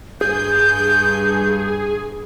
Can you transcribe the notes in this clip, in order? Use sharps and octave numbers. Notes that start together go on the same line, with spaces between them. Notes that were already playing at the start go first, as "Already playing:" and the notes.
G2 G#4 G6